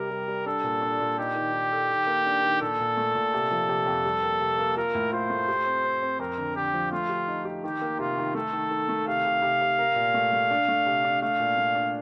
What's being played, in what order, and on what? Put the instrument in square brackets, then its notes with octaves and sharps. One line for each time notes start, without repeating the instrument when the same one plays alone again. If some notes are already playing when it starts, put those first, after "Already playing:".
Already playing: [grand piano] C3 G3 [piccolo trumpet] A#4
[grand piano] G3
G3
[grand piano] D4 [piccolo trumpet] A4
[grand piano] A#2
D4
A#2
[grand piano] D#4 [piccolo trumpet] G4
[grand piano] D#3
D#3
A4
D#3
A#3
D4
D#3
[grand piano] A#2 [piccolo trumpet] A4
[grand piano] A#2
A3
A#2
C3
F3
C3
F2
G3
A#3
C3
A#3
[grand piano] F4 [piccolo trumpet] A#4
[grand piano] A2
[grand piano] F4 [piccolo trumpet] C5
[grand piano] A3
G4
C4
C4
C4
[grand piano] F2 [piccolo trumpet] A#4
[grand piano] D3
[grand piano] D3 [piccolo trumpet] G4
[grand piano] F3
[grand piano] A3 [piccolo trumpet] F4
[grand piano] G4
D#4
G4
[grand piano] D#3 [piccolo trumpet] G4
[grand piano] A#3
[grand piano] C3 [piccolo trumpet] F4
[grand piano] D#3
[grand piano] A3 [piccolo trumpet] A4
[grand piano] D#3
D#3
A3
[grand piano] C3 [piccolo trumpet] F5
[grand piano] C3
C3
C3
A#4
A#2
A3
A3
D4
A3
C3
D4
[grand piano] A3 [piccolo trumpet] F5
[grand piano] A#2
A3
D4